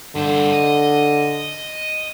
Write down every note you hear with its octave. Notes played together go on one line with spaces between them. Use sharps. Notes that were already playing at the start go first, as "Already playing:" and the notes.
G2 D3 C5
D#5